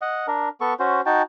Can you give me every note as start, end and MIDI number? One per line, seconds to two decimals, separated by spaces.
0.01 0.26 75
0.01 0.26 78
0.27 0.49 62
0.27 0.49 70
0.61 0.74 59
0.61 0.74 69
0.61 0.74 85
0.79 1.01 61
0.79 1.01 66
0.79 1.01 72
1.06 1.22 63
1.06 1.22 66
1.06 1.22 79
1.06 1.22 81